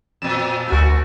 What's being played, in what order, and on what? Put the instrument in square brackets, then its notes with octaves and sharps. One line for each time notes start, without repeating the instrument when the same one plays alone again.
[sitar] F2 A#2 [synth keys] E7
[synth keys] D2 G#5 [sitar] A3 F#4 A#4